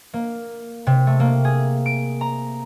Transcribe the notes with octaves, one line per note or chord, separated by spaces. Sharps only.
A#3
C3
A3
A#3
G#4
D7
A#5